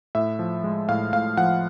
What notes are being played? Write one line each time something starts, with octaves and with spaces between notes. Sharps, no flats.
A2 E5
F3
G#3
A2 F5
A2 F5
F3 F#5